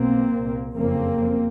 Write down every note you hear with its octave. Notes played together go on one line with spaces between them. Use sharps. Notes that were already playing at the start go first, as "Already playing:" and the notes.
Already playing: B1 B2 A#3 C4
C2 A#2
F#1 F2 C#3 A#3 C4